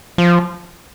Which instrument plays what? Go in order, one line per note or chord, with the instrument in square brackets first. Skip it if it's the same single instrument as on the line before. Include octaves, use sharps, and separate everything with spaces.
[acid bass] F3